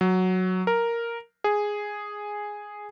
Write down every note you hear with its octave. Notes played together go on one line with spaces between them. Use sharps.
F#3
A#4
G#4